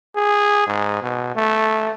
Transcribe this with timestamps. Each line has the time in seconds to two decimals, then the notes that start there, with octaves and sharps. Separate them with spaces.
0.15 G#4
0.67 G#2
1.02 B2
1.35 A3